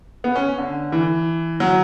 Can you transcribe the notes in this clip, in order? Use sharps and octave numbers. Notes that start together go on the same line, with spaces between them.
B3
C#4
D3
E3
F#3